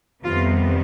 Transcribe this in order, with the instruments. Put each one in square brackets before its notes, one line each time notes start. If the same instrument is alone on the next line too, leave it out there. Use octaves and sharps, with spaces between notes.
[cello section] F2 C3 D#3 G3 B3 F4